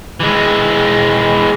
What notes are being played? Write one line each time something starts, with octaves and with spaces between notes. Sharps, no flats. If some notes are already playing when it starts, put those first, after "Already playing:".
E3 G#3